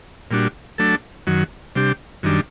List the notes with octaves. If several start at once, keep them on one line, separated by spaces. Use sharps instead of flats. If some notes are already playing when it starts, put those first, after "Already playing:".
A#2 G3 D4 F#4
F#3 A3 D4 A4
F#2 D#3 F#3
C3 G3 D4 G4
F#2 D#3 G3 D4